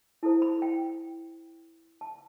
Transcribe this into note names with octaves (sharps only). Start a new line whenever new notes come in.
E4 A4 C5 A5
B5
G5
A5